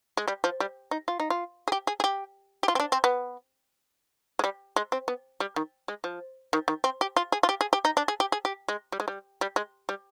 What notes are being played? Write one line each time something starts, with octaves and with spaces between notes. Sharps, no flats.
G#3
G3
F3
G3
D#4
F4
D#4
F4
G#4
G4
G#4
G#4
G4
G4
F4
C4
D4
C4
B3
G#3
G3
G#3
C4
B3
G3
D#3
G#3
F3
D#3
D#3
C4
G4
F4
G#4
F4
G4
G#4
G4
D#4
D4
G#4
G4
G#4
G4
G#3
G3
G#3
G3
G3
G#3
G3